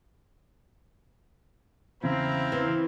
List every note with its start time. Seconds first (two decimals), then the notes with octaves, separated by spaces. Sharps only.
2.04 E2 C#3 C4 E4 F5 A#5
2.52 E3